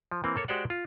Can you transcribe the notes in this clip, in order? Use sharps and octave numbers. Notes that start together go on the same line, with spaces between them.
F3
E3 A#3 C4
A#3 A4 C#5
G#3 F#4 G4 C5 D5 F#5
F4